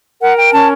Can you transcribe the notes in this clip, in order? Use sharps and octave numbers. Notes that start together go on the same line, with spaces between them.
A#4 F#5
G5
C#4 A5